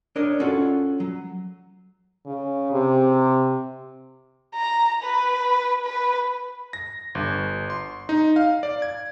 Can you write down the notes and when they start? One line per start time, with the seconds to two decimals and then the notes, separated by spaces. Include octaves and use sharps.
0.16 D4 A#4 C#5 D#5
0.40 C#4 F4 F#4 A4
1.00 F#3
2.26 C#3
2.73 C3
4.55 A#5
5.03 B4
5.85 B4
6.73 A#6
7.15 G1
7.70 C6
8.09 D#4
8.36 F5
8.63 D5
8.82 G#6